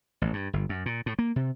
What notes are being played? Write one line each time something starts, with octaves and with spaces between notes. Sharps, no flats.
A1
G2
G1
F#2
A#2
A2
A#3
C3